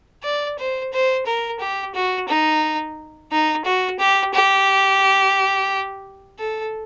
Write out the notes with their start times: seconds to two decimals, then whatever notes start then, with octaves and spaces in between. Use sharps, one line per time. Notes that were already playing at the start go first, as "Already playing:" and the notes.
0.24 D5
0.59 C5
0.93 C5
1.26 A#4
1.60 G4
1.94 F#4
2.28 D#4
3.31 D#4
3.65 F#4
3.99 G4
4.34 G4
6.39 A4